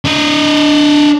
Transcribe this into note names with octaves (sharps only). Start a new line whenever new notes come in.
D4 D#5